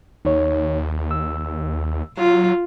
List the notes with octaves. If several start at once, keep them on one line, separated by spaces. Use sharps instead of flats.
D#2 D#4 C#5
E6
F#3 F4